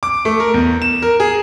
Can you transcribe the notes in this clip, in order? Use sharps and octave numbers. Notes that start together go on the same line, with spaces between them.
D6
A3
A#4
E2
E7
A#4
G#4